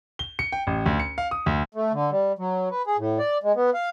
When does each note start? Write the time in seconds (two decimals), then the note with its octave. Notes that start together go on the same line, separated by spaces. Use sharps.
0.19 G7
0.39 C#7
0.52 G5
0.67 A1
0.86 D2
1.00 C#7
1.18 F5
1.31 D#6
1.46 D2
1.75 A3
1.93 D3
2.11 G3
2.39 F#3
2.71 B4
2.87 G#4
2.98 A2
3.19 D5
3.43 G#3
3.56 B3
3.74 F5